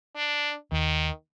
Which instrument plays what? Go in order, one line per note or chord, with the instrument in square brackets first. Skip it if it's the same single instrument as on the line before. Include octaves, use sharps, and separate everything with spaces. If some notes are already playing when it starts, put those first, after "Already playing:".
[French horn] D4
[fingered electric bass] D#2 [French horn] D#3